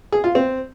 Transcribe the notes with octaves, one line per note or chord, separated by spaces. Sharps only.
G#4
F4
C4